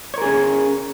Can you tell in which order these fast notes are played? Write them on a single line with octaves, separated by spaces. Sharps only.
C#5 A#4 G#4 C#4